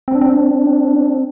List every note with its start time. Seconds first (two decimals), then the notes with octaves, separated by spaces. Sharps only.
0.08 C4
0.15 D4
0.21 C4
0.30 D4
0.37 C4
0.43 D4
0.51 C4
0.59 D4
0.67 C4
0.73 D4
0.81 C4
0.88 D4
0.96 C4
1.03 D4
1.10 C4